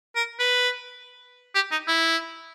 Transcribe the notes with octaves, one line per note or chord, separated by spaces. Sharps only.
A#4
B4
G4
D#4
E4